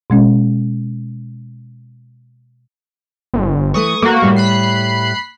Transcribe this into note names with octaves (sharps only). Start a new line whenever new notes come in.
B2 G#3 C#4
G1
E3 A3 C#6 D#6
A3 A#3 F#4
A2 G3
B5 F#6 C7